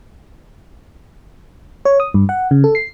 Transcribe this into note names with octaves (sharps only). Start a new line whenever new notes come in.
C#5
D#6
G2
F#5
C#3
A4
C7